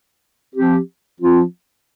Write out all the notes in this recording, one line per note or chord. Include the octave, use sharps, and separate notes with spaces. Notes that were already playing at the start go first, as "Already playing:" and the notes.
F3 C4 G4
F3 C4 F4